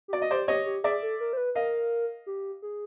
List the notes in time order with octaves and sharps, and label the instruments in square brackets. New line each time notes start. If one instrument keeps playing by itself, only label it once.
[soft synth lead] G4
[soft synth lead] F#4 [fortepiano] D5
[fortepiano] D#5
[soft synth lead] G4 [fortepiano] C5 D5
[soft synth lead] G4 [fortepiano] C#5 D#5
[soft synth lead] G4
[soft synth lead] G#4 [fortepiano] D5 E5
[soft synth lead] A4
A#4
C5
B4
[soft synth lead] A#4 [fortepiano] D#5 F5
[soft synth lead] G4
G#4